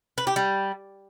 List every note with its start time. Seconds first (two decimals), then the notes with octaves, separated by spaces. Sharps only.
0.18 B4
0.27 G4
0.36 G3